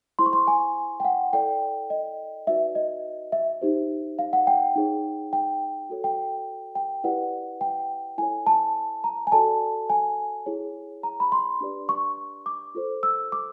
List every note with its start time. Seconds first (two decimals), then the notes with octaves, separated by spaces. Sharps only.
0.19 E4 G#4 C5 C6
0.26 C#6
0.33 C6
0.47 G#5
1.00 G5
1.05 F#5
1.33 E4 A4 D5 G5
1.90 D#5
2.47 D#4 F#4 B4 D5 E5
2.75 D#5
3.32 E5
3.61 D#4 G4 C5
4.19 F5
4.33 F#5
4.47 G5
4.76 D#4 G#4 C#5
5.33 G5
5.90 F#4 A4 C#5
6.04 G5
6.75 G5
7.04 E4 G4 B4 D5 F#5
7.61 G5
8.18 E4 A4 C#5 G#5
8.46 A5
9.04 A#5
9.27 G#5
9.32 F#4 A4 D5 A5
9.90 G#5
10.46 E4 G#4 C#5
11.03 A#5
11.20 B5
11.32 C6
11.61 D4 G4 B4 D5
11.89 C#6
12.46 D6
12.75 F4 A4 C5
13.03 E6
13.32 D6